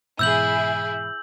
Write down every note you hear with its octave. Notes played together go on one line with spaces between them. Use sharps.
G#2 B2 E3 E4 G#4 E6 G6 F#7